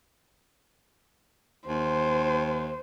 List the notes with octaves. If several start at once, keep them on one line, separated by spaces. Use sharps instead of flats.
D#2 C5